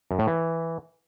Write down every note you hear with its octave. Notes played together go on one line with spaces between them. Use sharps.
F#2
A2
E3